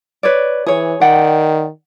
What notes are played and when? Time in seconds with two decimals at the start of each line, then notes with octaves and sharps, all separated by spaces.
0.23 B4 C#5 D5
0.66 E3 G#4 C#5
1.01 D#3 D5 F#5 G5